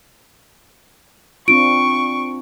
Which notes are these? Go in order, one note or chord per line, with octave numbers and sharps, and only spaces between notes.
C4 D4 F4 C#6 D7